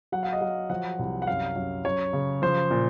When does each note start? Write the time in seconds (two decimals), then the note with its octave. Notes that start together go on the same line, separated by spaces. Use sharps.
0.12 F#3 F#5
0.23 F5
0.33 D#5
0.41 F#3 F5
0.70 F3 F#5
0.99 C2
1.22 F#5
1.27 F#2 F5
1.56 F#2
1.85 F#2 C#5
2.13 C#3
2.42 F3 C5
2.71 A#2